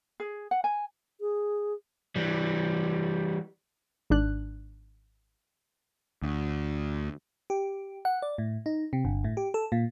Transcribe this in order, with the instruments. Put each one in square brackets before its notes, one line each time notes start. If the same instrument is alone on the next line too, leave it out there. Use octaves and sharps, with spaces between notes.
[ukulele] G#4
F#5
G#5
[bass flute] G#4
[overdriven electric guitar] E3 G3
[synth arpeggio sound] G#1 G#2 D4 F#6
[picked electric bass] D2
[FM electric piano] G4
F#5
D5
A2
D#4
C3
G1
A2
G4
A4
A#2